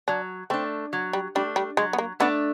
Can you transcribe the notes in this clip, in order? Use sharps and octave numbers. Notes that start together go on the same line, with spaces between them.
F#3 D4
A3 C4 D4
F#3
G3
G3 A3 D4
G3
F#3 G#3
B3
A#3
A3 B3 D4